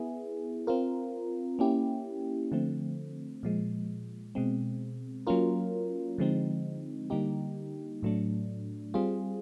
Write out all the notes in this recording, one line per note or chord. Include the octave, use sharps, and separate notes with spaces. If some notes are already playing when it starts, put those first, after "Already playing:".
Already playing: B3 E4 G#4
C4 F4 A#4
A#3 C#4 E4 G4
D3 F3 A3 C4
A#2 F3 G#3
B2 G#3 C4
F#3 A#3 C#4 F4 A#4
D3 F3 G#3 C4 D#4
D3 G3 A#3 D#4 G4
A2 F#3 A3 D4
G3 C4 F4 G#4